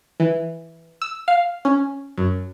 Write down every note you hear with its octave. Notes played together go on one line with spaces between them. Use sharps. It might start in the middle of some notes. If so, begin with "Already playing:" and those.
E3
E6
F5
C#4
F#2